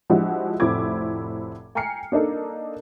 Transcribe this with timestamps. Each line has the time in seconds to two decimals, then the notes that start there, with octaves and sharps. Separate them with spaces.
0.10 F3 G#3 D4 E4 F#4 G4
0.60 F1 A2 C4 E4 D6 G#6
1.75 G5 G#5 A#5 F6 C7 C#7
2.12 A#3 D4 D#4 A4